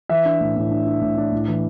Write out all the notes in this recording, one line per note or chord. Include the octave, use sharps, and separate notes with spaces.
E3 E5
D4
A2
A2
D4
D4
A2
D4
A2
E3